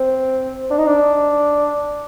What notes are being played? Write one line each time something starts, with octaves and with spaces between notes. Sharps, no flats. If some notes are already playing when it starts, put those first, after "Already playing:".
Already playing: C4
D4
D#4
D4